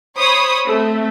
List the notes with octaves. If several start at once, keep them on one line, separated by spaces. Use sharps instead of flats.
C5 C#5 B5 D#6
A3 C4